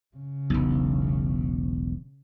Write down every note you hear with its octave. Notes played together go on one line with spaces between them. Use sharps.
C#3
E1 B1